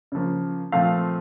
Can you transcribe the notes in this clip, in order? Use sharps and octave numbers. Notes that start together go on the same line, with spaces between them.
C#3 F3 A#3
A#2 F3 A3 C4 F5